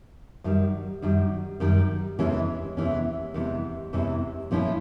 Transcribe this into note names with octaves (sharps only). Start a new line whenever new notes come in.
F#2 D#3 G3
F#2 D#3 G3
F#2 D#3 G3
E2 C3 E3 G#3 C#4
E2 C3 E3 G#3 C#4
E2 C3 E3 G#3 C#4
E2 C3 E3 G#3 C#4
A#2 F3 G#3 C#4 E4